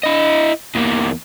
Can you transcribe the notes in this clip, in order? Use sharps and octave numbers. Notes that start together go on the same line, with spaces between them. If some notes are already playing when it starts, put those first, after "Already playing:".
E4 D#5
E2 A#3